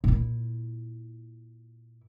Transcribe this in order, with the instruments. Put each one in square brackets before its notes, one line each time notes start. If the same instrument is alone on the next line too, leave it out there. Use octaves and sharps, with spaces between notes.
[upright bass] A#2 E4